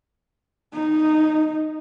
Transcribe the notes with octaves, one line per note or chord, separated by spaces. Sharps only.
D#4